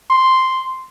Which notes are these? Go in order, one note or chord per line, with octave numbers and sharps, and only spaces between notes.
C6